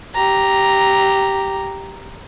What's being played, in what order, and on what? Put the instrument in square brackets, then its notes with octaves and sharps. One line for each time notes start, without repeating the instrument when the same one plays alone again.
[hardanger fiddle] G4 A#5